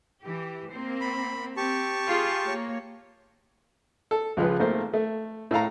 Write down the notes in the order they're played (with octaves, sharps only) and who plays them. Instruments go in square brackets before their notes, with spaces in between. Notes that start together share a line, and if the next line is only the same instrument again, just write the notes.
[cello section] E3 G4
A#3 C4 C5
[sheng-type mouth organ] B5
[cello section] C4 [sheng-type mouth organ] G4 A5 C#6
[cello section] F4 G#4
A#3 C#5
[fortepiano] A4
C#2 F3 G#3 F4 B4
G#1 A3 A#3 C5
A3
A2 A4 F5 A#5